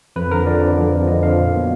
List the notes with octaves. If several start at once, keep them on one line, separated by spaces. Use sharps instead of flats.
F2 B4
D3 F3 A#4
F2 D5
D3 F3
F2
D3 F3
F2 D#5
D3 F3 F5
A#2
F#3 B3